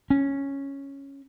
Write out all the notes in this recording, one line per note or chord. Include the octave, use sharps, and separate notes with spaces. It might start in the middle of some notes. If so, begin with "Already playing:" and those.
C#4